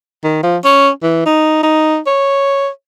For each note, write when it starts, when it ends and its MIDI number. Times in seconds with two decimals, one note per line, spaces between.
0.24 0.40 51
0.43 0.57 53
0.65 0.89 61
1.03 1.24 52
1.26 1.58 63
1.63 1.98 63
2.07 2.69 73